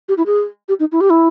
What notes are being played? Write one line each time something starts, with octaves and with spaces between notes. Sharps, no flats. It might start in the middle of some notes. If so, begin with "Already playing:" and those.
G4
E4
G#4
G4
D#4
E4
G4
E4